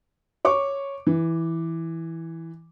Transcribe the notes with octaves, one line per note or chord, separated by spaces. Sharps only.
C#5 C#6 D6
E3